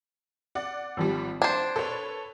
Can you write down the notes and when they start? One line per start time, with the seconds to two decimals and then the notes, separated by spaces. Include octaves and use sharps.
0.55 D5 F#5
0.97 G#1 F3 G3
1.42 D4 C5 G#6
1.76 A4 B4 C#5